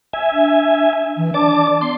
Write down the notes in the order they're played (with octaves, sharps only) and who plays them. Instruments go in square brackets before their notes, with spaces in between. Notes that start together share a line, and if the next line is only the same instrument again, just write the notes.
[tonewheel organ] E5 G#5
[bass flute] D4
E3
[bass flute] D4 [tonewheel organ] D5 A5 D6
[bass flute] B3 [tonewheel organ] C6